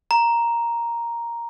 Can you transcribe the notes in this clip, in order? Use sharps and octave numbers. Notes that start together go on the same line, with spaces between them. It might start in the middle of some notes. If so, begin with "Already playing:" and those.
A#5